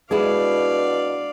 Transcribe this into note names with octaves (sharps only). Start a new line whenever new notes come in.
B2 G#3 D4 E4 G#4 D5 F5